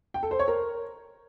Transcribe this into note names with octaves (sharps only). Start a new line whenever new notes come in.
G5
A4
C5
C#5
A#4